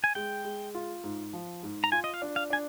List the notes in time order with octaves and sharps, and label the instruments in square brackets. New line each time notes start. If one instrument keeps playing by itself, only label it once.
[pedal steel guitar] G#5
[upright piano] G#3 [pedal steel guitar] G5
[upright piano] G#3
F4
G#2
F3
G#2
[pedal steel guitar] A#5
[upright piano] F4 [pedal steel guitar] G#5
[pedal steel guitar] D#5
F5
[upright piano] D4
[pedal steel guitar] F5
[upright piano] D4 [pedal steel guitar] G#5